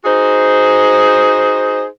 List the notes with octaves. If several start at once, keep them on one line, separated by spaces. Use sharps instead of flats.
D#4 F#4 G#4 C5